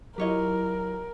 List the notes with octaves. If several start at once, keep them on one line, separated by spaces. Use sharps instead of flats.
F#3 E4 F4 G4 A#4 C#5 D#5